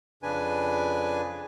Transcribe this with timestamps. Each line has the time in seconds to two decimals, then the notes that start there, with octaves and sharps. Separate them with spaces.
0.23 F2 C#3 D4 B4 G#5